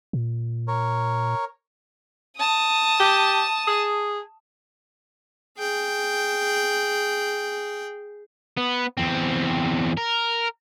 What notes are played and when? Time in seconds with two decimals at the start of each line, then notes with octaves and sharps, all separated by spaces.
0.13 A#2
0.68 A#4 C#5
2.37 A5 D#6
3.00 G4
3.67 G#4
5.58 G#4 G5
8.58 B3
8.98 E2 C4
9.97 A#4